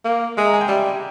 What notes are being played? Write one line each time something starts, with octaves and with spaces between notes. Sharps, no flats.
A#3
G#3 E5
A#5
G#5
G5
G3 E5